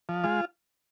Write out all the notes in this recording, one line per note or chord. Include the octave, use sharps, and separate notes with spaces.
F3
G#3 F4